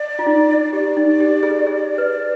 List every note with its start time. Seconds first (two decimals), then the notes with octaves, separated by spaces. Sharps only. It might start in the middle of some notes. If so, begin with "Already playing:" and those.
Already playing: D5
0.19 F4
0.26 D#4
0.73 G4 D5
0.97 D#4
1.20 G4
1.43 G#4
1.67 G#4
1.98 B4